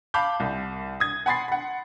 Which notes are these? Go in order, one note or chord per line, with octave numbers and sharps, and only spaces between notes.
F5 A5 B5 D6 G6
C2
D#6 G#6
F#5 G#5 B5 C6 A6 C7
F#5 B5